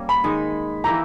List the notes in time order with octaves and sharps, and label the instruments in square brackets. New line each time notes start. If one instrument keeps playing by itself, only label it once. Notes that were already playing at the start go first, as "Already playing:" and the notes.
Already playing: [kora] G3 A#3 C#4
[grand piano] B5
[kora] D#3 G#3 D#4
[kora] E3 A#3 E4 G4 [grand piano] A#5